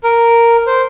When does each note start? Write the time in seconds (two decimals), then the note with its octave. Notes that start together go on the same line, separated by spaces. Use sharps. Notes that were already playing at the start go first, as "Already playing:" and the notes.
0.04 A#4
0.67 C5